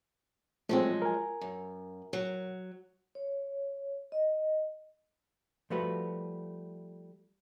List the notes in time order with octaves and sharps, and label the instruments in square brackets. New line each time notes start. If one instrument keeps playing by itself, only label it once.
[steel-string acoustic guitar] F3 F#3 G#3 [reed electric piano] A3 C4
[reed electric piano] A#4 G#5
[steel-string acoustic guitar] F#2
F#3
[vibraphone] C#5
D#5
[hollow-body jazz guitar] F3 G3 A3 F#4 B4